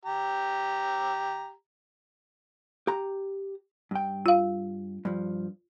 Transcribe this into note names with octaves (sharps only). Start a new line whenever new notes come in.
G4 A#5
G4 A#5
G2 G5
F4 F5
G2 F3